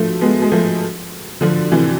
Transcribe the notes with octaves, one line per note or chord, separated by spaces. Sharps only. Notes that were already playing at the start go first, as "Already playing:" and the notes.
Already playing: F3 A3
G#3 B3
G#3
F3 A3
D3 F3
C3 E3